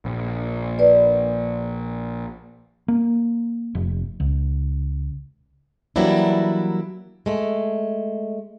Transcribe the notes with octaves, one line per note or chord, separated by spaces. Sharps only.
A#1
B4 D5
A#3
F1
C#2
E3 F#3 G3 A#3 D4 E4
G#3 A3